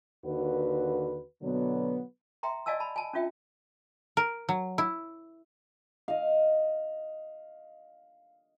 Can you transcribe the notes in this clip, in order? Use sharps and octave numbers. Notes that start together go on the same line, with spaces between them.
D#2 D3 F#4 B4
B2 D3 F#3 B3
E5 G5 A#5 C6
D5 D#5 F5 G#5 A5 E6
A5 B5
G#5 A5
C#4 D4 F4 E5 G5
A#4
F#3
E4
D#5 F5